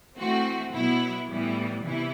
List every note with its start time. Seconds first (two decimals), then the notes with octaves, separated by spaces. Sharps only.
0.18 E3 A3 C4 F#4
0.72 B2 F#3 B3 E4
1.28 A2 E3 G3 B3 E4
1.83 C3 E3 B3 E4